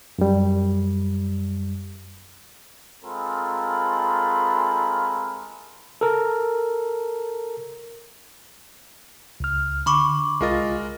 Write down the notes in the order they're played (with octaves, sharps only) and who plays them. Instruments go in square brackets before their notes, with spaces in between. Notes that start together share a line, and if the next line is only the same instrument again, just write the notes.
[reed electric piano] F#2 G3
[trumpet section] G#3 C4 F4 A4 A#4 B5
[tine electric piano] A4 A#4
[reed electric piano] C#2 F6
[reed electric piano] D3 [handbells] B5 C#6 D6
[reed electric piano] C2 F4 A6 [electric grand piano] G#3 A#4 D#5